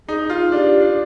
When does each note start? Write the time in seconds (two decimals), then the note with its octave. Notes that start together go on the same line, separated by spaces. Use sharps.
0.08 D#4 G#4
0.30 F4
0.41 F4
0.52 D4 G4
0.81 D4